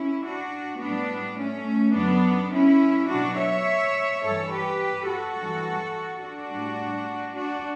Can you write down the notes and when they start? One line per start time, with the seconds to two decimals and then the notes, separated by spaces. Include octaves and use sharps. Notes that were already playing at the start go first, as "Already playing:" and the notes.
Already playing: C#4 E4
0.24 D4 F#4
0.81 A2 G3 B3 D4
1.38 A3 C#4
1.95 F#2 D3 F#3 B3 D4
2.52 C#4 E4
3.08 B2 F#3 D4 F#4
3.38 C#5 E5
4.22 G2 E3 G3 A4 C#5
4.51 G4 B4
5.08 F#4 A4
5.36 G2 E3 G3
6.22 D4 F#4
6.50 A2 G3
7.35 D4 F#4